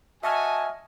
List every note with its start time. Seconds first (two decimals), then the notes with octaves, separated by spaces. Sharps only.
0.23 F#4 D#5 E5 G#5 A5 C#6 F6